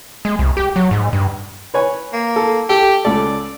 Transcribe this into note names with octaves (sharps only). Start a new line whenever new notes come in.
G#3
C2
G4
F#3
G#2
G2
B4 C#5 G#5
A#3
A4
G4 A4
C#2 A4 D5